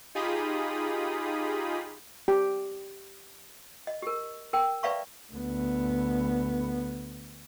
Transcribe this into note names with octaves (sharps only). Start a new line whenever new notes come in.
D#4 F4 G4 G#4 B5 D#6
G4
D#5
G4 A#4
A#4 G5 A5
B4 D5 E5 F5 A#5 C#6
D2 B3